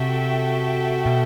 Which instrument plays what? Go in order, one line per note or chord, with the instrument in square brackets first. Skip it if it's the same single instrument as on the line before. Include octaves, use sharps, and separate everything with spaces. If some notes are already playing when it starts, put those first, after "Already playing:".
Already playing: [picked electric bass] C3 [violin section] F#4 A4 E5 G5
[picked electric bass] B2